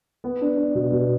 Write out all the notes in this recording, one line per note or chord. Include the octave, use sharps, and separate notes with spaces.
B3
D4
D4
B2
B2